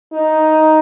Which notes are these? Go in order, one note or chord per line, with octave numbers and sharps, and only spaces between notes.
D#4